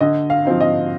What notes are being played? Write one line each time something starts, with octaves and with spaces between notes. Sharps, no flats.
D3 D#5
F5
F3 C4 D#4
D#5